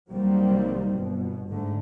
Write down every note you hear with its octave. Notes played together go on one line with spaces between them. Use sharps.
C2 D#3 F#3 G3 A#3 C4
G1 B2
G#2 D3 A3